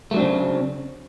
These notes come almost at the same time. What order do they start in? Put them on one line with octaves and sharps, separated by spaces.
A3 F#3 D4 C4 C#3